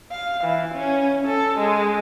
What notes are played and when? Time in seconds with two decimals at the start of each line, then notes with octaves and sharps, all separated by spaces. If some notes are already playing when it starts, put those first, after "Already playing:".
0.12 F5
0.44 E3
0.74 C#4
1.26 A4
1.59 G#3